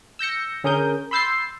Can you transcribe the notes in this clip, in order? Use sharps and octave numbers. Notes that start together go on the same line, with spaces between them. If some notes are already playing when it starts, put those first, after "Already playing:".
E6 G6 A#6 C#7
D3 C#4 G#4 A#4 D#6 G6
B5 C6 E6 G6 A6 C7